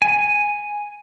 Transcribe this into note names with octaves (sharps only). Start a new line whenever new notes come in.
G#5